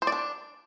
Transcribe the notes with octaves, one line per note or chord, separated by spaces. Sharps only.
C5
D5
D4